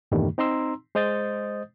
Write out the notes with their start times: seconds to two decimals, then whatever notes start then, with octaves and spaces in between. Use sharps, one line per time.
0.12 E2 G2 A#2 D#3 G3 A3
0.38 C4 D#4 A#5 C6 E6
0.95 G#3 C5 D#5 D#6 G6 A6